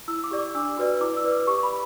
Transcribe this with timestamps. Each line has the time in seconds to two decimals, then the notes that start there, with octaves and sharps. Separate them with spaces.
0.08 E4 E6
0.24 D6
0.31 G4 D5
0.39 D6
0.55 D4 E6
0.78 F#4 B4 D5
1.01 E4 D6
1.17 E6
1.24 B4 D5
1.32 D6
1.47 G4 C#6
1.63 B5